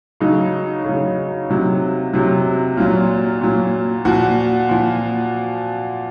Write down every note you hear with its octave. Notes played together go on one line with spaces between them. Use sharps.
C#3 F#3 D#4
C#3 F#3
C3 F#3
C3 F#3
A#2 F#3 F4
A#2 F#3
A#2 F3 F#4
A#2 F3